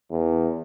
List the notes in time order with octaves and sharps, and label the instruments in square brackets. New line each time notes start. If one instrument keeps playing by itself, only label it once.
[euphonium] E2